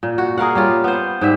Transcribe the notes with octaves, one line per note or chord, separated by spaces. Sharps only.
A#2
F#4
G#4 A#4 F5 F#5
G3 C#4 F4
B3 C5
G#2 G3 E5